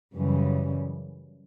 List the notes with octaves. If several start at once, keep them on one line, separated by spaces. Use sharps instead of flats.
F#2 C#3 E3 G3